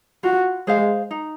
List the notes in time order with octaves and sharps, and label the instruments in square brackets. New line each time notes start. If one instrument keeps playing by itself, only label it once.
[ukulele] F4 [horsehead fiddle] F#4
[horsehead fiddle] G#3 [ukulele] G#4 C5 F5
[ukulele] D#4